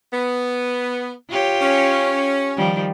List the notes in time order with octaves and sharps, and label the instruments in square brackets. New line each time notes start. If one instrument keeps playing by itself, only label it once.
[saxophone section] B3
[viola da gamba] F4 G4 C#5
[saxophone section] C#4
[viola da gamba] D#3 F3 G3